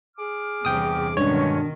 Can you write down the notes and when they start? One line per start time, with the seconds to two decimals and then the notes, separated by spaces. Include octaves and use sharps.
0.18 G#4 D6 F6
0.65 E2 G2 C3 G5 D#6
1.17 G2 B2 D3 D#3 G#3 C#4 D4 C#5